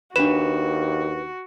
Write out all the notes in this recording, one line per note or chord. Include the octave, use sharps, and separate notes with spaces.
D#2 D4 F#4 B4 E7